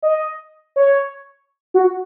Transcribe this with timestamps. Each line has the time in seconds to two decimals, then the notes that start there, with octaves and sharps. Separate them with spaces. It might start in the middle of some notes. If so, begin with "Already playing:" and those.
0.03 D#5
0.76 C#5
1.74 F#4